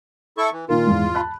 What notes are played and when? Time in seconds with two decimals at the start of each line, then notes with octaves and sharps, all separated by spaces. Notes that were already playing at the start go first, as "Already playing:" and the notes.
0.38 E4 A4 C#6
0.52 E3
0.69 A#2 D#3 F4 A#4
0.87 E2 G#2 G#3
1.15 A5 B5 F#6